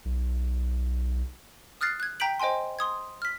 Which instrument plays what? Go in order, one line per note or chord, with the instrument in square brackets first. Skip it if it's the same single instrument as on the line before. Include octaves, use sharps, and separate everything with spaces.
[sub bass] B1
[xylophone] D#6 F6 F#6 A6 C7
F#6 G#6
G5 A#5 G6 B6 D7 F#7
C5 D#5 G5 G#5 C6
C6 D#6 G#6
F6 B6